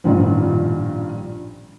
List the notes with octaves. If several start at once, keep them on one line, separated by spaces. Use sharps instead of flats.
A1 G2 A#2 D#3 F3